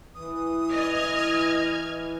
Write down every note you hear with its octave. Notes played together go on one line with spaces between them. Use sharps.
E3 D#6
D#5 F6 G#6